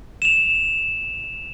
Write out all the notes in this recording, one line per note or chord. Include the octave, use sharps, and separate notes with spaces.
E7 F7